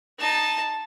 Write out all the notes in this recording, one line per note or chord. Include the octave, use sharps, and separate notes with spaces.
D#4 A5